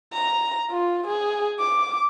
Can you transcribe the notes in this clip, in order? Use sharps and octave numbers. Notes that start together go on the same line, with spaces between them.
A#5
F4
G#4
D6